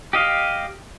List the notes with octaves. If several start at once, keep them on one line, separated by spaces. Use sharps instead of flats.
G4 D#5 F5